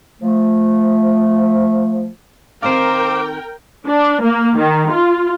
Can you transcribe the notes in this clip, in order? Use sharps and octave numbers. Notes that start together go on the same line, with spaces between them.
F3 A3
D#3 C4 D#4 A#4 C5 F5 G5 D6
D4
A#3
D#3
F4